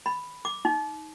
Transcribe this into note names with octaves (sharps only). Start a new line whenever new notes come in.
B5
D6
D#4